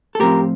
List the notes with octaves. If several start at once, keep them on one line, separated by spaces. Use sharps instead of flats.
A4
A2 F3 C4 F4 G4 A#4